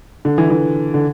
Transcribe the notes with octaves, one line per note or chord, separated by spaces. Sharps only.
D3
E3
E3
D3